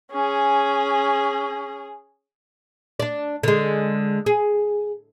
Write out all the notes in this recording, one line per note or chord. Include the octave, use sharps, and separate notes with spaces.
C#4 G#4
D4 D5
D3 G#3
G#4